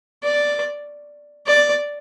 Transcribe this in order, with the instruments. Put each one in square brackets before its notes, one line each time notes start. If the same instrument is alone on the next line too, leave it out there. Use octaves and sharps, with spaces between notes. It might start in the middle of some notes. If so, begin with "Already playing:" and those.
[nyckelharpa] D5
D5